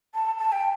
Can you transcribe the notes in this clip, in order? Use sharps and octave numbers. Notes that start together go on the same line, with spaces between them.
A5
A5
G5